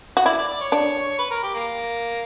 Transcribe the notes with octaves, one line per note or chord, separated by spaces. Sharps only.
F#4
E4 D5
D5
D5
C#5
D4
B4
A#4
G4
A#3